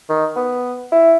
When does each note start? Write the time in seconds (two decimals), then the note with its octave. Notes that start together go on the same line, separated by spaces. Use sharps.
0.10 D#3
0.36 B3
0.92 E4